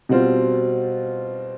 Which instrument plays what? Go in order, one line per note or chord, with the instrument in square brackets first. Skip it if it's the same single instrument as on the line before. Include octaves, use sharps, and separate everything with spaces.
[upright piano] B2 G3 C4 F4